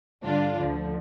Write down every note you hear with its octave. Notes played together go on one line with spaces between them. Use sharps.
G2 D3 G3 D4 F4
D2 D3 F3